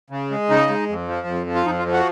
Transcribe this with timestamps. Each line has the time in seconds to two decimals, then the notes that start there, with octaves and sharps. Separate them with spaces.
0.10 C#3
0.31 G#3
0.49 C#3 D#4
0.69 G#3
0.89 F2
1.08 F3
1.27 F2
1.47 F3
1.55 F4
1.66 F2 D#4
1.79 F4
1.86 F3
1.92 F#4